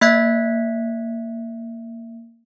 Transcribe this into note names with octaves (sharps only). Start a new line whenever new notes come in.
A#3 E5 F#6 G#6 B6